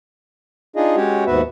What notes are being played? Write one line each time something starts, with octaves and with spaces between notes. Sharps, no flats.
D4 D#4 F4 G#4 D#5
G#3 C#4 F#4 G4 C#5
D#2 G#2 B3 F#4 B4 E5